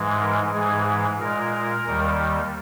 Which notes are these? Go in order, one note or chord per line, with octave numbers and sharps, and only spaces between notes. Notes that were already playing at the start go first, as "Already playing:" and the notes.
Already playing: G#2 E3 G#3
A#4
G#2 E3 G#3 G#4
A#2 G#3 A#4
D#2 D#3 G3